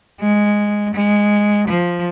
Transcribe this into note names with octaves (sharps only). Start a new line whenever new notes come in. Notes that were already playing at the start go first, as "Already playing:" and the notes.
G#3
G#3
F3